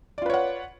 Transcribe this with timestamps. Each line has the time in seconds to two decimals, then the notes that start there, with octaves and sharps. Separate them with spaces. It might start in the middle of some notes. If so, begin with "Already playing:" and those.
0.18 D5
0.22 F4
0.26 B4
0.30 C#5
0.34 F#5